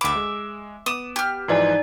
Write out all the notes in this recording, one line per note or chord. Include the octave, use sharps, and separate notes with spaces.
D2 E5 B5 D6
G#3
B3 D6 D#6 E7
G4 F6
G#2 E3 F3 D#4 D5 G#5